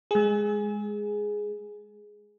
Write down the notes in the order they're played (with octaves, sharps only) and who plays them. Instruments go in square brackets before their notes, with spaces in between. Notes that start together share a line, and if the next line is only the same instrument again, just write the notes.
[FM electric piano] G#3 G#4